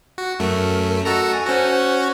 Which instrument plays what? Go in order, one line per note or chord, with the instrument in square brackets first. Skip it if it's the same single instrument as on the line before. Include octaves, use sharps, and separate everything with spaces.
[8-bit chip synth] F#4
[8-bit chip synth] F#2 A3 [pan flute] A#4
[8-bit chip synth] F#4 A4 A#5 [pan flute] D#5
[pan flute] G#5
[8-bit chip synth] C#4 F#4 [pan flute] C5